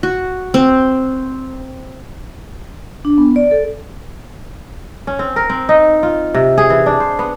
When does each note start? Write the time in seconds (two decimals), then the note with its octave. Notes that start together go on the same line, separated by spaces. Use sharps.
0.03 F#4
0.54 C4
3.05 D4
3.18 B3
3.36 D5
3.51 A4
5.07 C#4
5.19 C4
5.36 A#4
5.50 C4
5.69 D#4
6.03 F4
6.34 C3
6.58 G#4
6.70 E3
6.86 D4
7.00 C5
7.19 B3